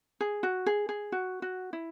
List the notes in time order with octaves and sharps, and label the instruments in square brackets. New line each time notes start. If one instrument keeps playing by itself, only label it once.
[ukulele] G#4
F#4
G#4
G#4
F#4
F#4
E4